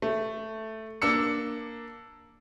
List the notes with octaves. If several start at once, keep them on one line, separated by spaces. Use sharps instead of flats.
A3
A#3 D4 E6 C#7